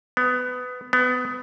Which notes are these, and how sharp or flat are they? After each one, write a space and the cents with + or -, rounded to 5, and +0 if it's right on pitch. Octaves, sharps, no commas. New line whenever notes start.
B3 +20
B3 +25